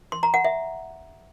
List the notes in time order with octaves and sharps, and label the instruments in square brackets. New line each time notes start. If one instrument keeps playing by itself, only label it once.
[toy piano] C6
A#5
F#5
E5